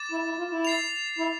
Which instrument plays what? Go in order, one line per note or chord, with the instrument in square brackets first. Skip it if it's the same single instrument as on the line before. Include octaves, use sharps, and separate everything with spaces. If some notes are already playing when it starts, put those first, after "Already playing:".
Already playing: [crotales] D6 A6 E7
[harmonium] E4
E4
F4
E4
[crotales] A6 C7 F7
[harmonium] E4